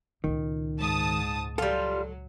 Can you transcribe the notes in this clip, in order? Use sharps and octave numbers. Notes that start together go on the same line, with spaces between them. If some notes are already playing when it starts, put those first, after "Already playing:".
C#2 A#2 D#3
G#2 A5 D#6
F#3 G3 F4 A4